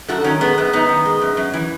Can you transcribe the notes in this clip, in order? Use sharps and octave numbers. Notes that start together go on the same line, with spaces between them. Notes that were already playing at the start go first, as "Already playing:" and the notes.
F#2 F#4 A4
D#3 C#4
G#3 B3
F#2 B3
F#2 B3 D#4
D#3
G#3
F#2
F#2
E3